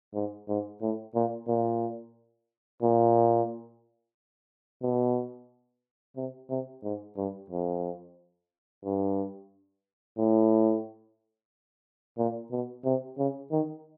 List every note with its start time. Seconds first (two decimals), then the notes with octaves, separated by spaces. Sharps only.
0.14 G#2
0.48 G#2
0.81 A2
1.15 A#2
1.48 A#2
2.82 A#2
4.82 B2
6.16 C3
6.50 C3
6.84 G#2
7.17 G2
7.50 F2
8.84 G2
10.18 A2
12.18 A#2
12.51 B2
12.85 C3
13.18 C#3
13.51 D#3